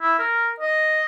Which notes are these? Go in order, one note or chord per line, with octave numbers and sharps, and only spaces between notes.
E4
A#4
D#5